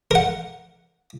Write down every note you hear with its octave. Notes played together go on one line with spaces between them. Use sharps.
A#4 F#5